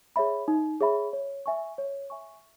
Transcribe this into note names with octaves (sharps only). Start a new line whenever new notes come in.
G#4 C#5 E5 B5
D#4
G#4 C#5 E5 B5
C#5
E5 G#5 C#6
C#5
E5 G#5 C#6